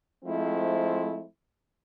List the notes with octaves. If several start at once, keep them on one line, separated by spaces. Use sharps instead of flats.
F3 G#3 A3 C4 E4